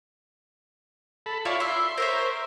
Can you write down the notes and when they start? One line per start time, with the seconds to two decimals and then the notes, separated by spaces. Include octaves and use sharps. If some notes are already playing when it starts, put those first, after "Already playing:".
1.26 A4 B5
1.45 E4 F4 C#5 D5 F#5
1.60 E4 E5 C6
1.98 A#4 C5 C#5 E5